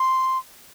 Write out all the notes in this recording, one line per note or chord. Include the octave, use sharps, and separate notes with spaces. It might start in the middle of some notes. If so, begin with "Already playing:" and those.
Already playing: C6